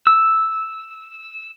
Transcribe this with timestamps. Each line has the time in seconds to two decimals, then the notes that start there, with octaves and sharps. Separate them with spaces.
0.07 E6